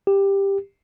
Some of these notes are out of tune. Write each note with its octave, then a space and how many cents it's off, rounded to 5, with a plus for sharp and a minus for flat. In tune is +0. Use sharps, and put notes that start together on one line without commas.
G4 +10